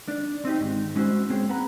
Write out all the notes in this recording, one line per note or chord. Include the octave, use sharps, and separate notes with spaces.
D4
C4 D#4 G4
G#2 D#3
G#3 C#4 E4 F#4 C5
G#3 B3 C4 G#4 C5 C#5
B4 F#5 A#5 B5